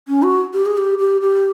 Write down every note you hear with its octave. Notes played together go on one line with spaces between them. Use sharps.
C#4
F#4
G4
G#4
G4
G4
G4